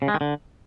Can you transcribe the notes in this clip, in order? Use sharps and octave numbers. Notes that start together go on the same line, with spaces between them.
C#3
G#3
D#3
D3